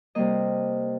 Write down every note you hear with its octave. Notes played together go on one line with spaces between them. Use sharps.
C3 G3 A#3 D#5